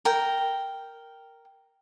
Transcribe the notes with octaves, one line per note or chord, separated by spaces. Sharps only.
A#4 G5